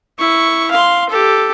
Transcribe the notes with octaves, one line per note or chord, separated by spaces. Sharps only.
E4 C#6
F5 C6
G4 A4